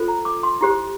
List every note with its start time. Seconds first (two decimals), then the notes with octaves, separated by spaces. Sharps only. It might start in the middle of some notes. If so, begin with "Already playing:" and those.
Already playing: F4 A4 C5
0.08 A#5
0.25 D6
0.43 C6
0.61 E4 G4 C5